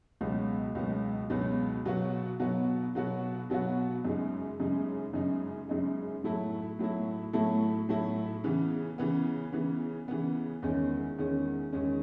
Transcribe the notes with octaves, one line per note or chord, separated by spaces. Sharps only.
C#2 B2 F#3 B3
C#2 B2 F#3 B3
C#2 B2 F#3 B3
B2 F#3 B3 F#4
B2 F#3 B3 F#4
B2 F#3 B3 F#4
B2 F#3 B3 F#4
F#2 C#3 G#3 D#4
F#2 C#3 G#3 D#4
F#2 C#3 G#3 D#4
F#2 C#3 G#3 D#4
A2 F#3 A3 E4
A2 F#3 A3 E4
A2 F#3 A3 E4
A2 F#3 A3 E4
C#3 E3 B3
C#3 E3 B3
C#3 E3 B3
C#3 E3 B3
E2 D#3 G#3 C#4
E2 D#3 G#3 C#4
E2 D#3 G#3 C#4